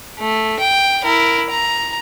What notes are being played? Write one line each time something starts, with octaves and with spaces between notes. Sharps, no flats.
A3
G5
E4 A#4
A#5